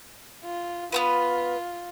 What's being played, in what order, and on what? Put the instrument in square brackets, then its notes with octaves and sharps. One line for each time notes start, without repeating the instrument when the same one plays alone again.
[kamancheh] F4
[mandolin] B3 C4 B4 [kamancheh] F4